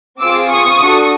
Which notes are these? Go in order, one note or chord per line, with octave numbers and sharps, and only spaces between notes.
C4 F4 G#4 D6 E6
C#6 D#6
D4 F#4 A4